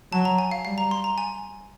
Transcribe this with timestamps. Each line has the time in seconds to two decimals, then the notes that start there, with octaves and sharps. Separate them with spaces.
0.12 F#3 A5
0.25 A#5
0.38 G#5
0.51 F5
0.65 G3 F5
0.78 A#5
0.91 C6
1.04 A#5
1.18 G#5